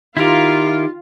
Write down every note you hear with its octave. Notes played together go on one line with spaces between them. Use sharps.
D#3 E4 F4 G4 A#4